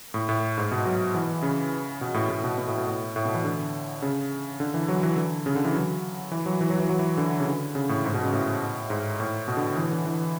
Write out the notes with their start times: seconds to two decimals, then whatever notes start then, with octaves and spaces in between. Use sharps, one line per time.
0.14 A2
0.29 A2
0.57 G#2
0.71 B2
0.85 F#3
1.15 E3
1.43 C#3
2.01 B2
2.14 A2
2.29 A2
2.44 B2
2.58 B2
2.67 A2
2.77 B2
2.87 A2
3.16 A2
3.25 B2
3.34 E3
3.44 D3
4.02 C#3
4.60 D3
4.74 E3
4.88 F#3
5.03 E3
5.16 D3
5.46 C#3
5.55 D3
5.65 E3
5.74 F#3
6.31 E3
6.46 F#3
6.61 E3
6.70 F#3
6.80 E3
6.89 F#3
6.99 E3
7.17 D3
7.39 C#3
7.47 D3
7.75 C#3
7.89 A2
8.04 G#2
8.14 B2
8.23 C#3
8.33 A2
8.90 G#2
9.20 A2
9.48 B2
9.57 D3
9.76 E3
9.91 D3
10.05 E3